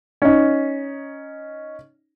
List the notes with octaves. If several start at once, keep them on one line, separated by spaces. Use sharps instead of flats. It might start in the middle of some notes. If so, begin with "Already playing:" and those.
C#4 D#4